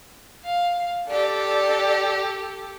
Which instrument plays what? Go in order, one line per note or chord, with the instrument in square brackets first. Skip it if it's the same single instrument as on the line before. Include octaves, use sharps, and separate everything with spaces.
[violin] F5
[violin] G4 A4 [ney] D5